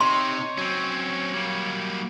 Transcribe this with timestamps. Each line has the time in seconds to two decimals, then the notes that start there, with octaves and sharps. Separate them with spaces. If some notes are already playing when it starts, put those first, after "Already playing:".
0.01 C3 D#4 C#5 C6
0.58 F#3 C4 C#4
1.34 G3 A#3